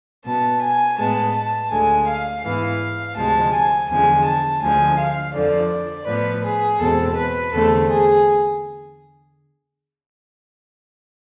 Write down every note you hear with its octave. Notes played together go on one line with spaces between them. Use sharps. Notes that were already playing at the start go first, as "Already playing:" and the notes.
B2 B3 A5
G#5
A2 G#3 B3 A5
A5
D2 D3 G#3 G#5
F5
G#2 E3 B3 F5
D2 C3 F3 G#3 A5
G#5
E2 D3 F3 G#3 G#5
A5
D2 D3 F3 G#3 G#5
F5
F2 D3 F3 D5
A2 F3 B3 B4
G#4
E2 B2 G#3 C4 A4
B4
E2 D3 A3 C4 A4
G#4